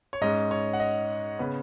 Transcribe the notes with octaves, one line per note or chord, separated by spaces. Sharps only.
C#5
G#2 G#3 C#4 D#5
C#5
F#5
D#5
C#3 B3